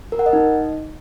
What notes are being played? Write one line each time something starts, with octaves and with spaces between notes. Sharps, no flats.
A#4
F#5
D#5
D#4